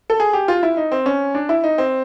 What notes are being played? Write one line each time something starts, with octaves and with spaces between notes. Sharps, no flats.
A4
G#4
G4
F4
E4
D#4
C4
C#4
D4
E4
D#4
C4